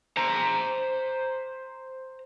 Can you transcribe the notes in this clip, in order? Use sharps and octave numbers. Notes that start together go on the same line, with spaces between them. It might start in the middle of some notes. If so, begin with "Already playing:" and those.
C5 A#5